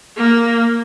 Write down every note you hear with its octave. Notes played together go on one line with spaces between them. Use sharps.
A#3